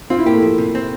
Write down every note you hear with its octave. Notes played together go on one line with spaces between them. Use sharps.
C4 F4
E4
A#3 G4
A3
F3
C3
C4